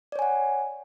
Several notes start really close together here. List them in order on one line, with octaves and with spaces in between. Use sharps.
D5 C#5 G#5 F#5